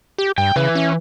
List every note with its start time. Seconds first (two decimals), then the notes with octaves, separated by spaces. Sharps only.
0.18 G4
0.38 G2 G5
0.56 C#3 E3 B4
0.75 C#4